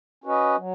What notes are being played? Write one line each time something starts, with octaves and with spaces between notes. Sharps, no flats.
C#4 F#4 B4 D#5
F#3